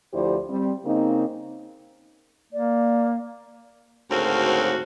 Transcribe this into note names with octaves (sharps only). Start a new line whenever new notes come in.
D2 F3 E4 G4 C5 D5
G3 C4
C#3 A#3 C4 D#4
A#3 D5
D2 G#2 C#3 C4 F#4 A#4